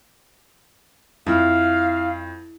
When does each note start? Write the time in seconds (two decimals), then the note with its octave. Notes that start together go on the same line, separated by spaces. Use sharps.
1.26 F2 E4 F5